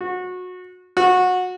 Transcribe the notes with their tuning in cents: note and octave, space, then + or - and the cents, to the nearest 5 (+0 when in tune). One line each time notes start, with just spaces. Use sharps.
F#4 -25
F#4 -20